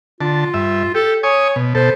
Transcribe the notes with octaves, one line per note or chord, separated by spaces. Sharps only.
D3 F4 A5
G2 E5
G4 A4
C#5 G#5 C#6 D#6
B2
B2 A4 C5